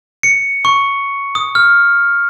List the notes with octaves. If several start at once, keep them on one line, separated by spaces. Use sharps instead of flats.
C#7
C#6
D#6
F6